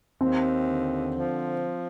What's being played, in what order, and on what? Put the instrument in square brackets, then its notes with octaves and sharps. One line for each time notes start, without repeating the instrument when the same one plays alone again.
[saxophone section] D#2 [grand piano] C4
[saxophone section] D3
F3